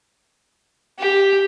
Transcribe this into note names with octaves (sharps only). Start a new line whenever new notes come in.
G4